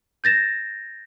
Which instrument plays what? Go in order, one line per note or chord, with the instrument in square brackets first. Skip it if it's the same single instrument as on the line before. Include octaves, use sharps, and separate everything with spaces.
[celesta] G6 A6 A#6 E7